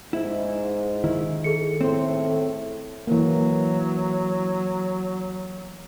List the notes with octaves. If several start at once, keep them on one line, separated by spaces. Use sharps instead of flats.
G#2 E4
D#3 E4
G#4 A4 C#7
A2 C4 C5
E3 F#3 A#3